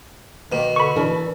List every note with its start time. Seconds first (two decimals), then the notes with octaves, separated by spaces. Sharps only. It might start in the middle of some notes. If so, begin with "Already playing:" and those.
0.52 B2 D#3 A#3
0.76 D3 B5 C#6
0.96 E3 D4 A#4